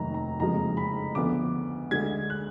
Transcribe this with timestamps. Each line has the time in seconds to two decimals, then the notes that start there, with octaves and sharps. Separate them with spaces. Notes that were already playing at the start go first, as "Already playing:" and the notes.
Already playing: F1 D#2 D#3 F#3 A#5
0.14 A#5
0.39 F#1 F2 F3 G#3 A#5
0.77 B5
1.15 D2 D3 F3 B3 D6
1.91 D2 D3 G#3 G#6
2.30 F#6